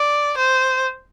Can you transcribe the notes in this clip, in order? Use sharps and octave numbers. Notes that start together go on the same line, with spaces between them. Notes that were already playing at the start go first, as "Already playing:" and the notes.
Already playing: D5
C5